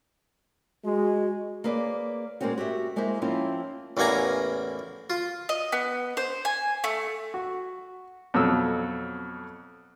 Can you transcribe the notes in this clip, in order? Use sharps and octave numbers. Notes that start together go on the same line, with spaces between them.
G#3 F#4
A#3 G#4 B4 C#5 D5
A#2 G#3 A#3 C4 C#4 F#4
F#4 G4 A#4 E5
G#3 A#3 E4 C5 E5
F3 A#3 C4 C#4 E4 F4
A1 E2 A#3 F#5 G#5 A#5
F4
D#5
B3
C5
G#5
A3
F#4
F2 B2 F#3 A4 E6